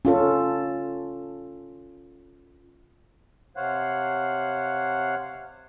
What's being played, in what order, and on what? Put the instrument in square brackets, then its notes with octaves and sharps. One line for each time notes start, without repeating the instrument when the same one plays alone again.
[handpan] C#4 F4 A4
[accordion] C3 C5 C#5 F5 F#5 F#6